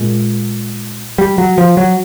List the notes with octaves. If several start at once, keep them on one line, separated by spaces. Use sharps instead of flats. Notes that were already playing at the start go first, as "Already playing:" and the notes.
Already playing: A#2 G#3
G3
F#3
F3
F#3